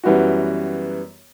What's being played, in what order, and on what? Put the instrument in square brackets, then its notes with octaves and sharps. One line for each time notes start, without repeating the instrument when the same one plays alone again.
[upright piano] F#2 E3 G3 B3 F#4